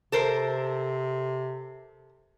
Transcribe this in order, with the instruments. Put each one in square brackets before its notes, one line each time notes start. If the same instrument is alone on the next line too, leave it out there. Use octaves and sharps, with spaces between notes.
[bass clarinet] C3 [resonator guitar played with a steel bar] A4 A#4 C5